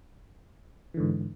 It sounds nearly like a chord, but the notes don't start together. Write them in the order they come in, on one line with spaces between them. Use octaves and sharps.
E3 D3 G#2